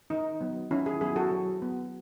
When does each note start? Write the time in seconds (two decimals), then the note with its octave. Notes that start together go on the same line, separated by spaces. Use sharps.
0.10 D#3 D#4
0.41 F#3 B3
0.71 D#3 C#4 E4
0.86 E4 G#4
1.01 F#3 B3 E4 G#4
1.16 F#4 A4
1.31 F#3
1.62 B3